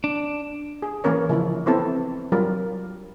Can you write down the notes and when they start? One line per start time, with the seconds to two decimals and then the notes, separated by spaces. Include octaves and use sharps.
0.04 D4
0.82 G#4
1.04 E3 A#3 C#4 A#4 C#5
1.29 C#3 F3 E4
1.66 B3 C4 E4 A4
2.32 F#3 G3 F4 A#4